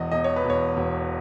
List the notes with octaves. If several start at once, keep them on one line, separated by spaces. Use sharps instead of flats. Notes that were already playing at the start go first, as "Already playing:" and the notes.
Already playing: E1 E2 D#5
E1 D#5
C#5
B4
E1
C#5
E1